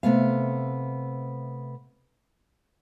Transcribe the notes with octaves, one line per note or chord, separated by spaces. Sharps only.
C3 A3 B3 F5